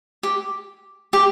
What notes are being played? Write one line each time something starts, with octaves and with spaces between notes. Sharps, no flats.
G4
G4